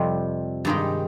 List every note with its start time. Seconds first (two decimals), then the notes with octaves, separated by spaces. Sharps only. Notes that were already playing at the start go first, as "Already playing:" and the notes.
Already playing: F2 C3 G3 C4 D#5
0.65 G2 D#3 G#3 D#4 G4